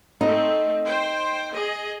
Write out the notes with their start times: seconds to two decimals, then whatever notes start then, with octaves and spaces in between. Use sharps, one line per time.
0.21 A3 C4 D#4
0.84 C5 G5
1.51 G#4 D#5